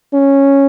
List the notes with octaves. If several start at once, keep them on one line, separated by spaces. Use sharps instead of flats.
C#4